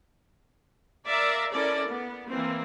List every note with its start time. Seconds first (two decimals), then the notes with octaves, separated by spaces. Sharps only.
1.06 A#4 D5 E5 F5 A#5
1.52 C#4 E4 A4 A#4 D5
1.88 B3
2.28 E3 A#3 C4